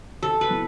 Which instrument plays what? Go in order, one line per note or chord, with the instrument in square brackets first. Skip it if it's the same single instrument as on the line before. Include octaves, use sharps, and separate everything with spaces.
[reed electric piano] C#3 [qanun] A4
[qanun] B4
[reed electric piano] F#3 B3 E4